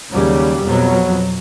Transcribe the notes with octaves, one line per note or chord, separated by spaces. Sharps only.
D#2 C#3 F#3 G3
F2 B2 F#3